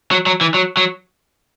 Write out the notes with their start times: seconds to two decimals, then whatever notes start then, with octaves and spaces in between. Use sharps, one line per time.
0.11 F#3
0.26 F#3
0.41 E3
0.54 F#3
0.77 F#3